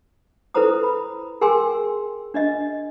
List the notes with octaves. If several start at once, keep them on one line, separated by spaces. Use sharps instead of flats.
E4 A4 B4 C5 A#5 D#6
B5
G#4 A#4 G5 G#5 C6 E6
D4 D5 D#5